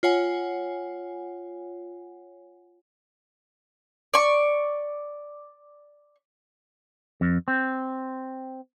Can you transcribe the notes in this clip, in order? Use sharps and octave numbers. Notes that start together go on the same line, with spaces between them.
F4 C#5 F#5 G#5
D5 C#6
F2
C4